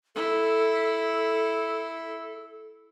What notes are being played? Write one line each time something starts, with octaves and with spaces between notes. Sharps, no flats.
E4 A4